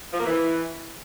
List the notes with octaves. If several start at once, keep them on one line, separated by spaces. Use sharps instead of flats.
F3
A#3
E3